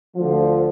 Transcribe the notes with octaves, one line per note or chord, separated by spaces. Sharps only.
D2 D3 F3